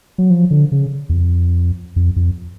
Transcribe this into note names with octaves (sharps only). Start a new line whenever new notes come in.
F#3
F3
D3
C#3
E2
F2
F2
F2